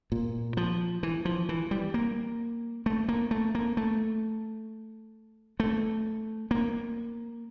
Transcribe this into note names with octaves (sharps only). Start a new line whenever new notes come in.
A#2
F3
E3
F3
E3
G3
A#3
A3
A#3
A3
A#3
A3
A3
A#3